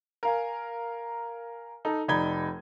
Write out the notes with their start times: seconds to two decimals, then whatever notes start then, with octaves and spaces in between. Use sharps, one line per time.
0.23 A#4 F5 G#5
1.85 D#4 A4
2.08 F1 D#4 D5 B5 G#6 G7